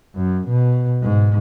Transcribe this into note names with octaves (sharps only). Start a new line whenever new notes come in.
F#2
B2
G#2